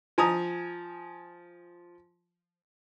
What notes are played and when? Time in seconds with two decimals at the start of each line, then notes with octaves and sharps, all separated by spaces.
0.18 F3 G#5 A#5 D#6